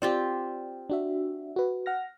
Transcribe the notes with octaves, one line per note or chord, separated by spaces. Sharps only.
C4 F4 G4 D5
D4 F#4 E5
F#4 B4
F#5 F6 A#6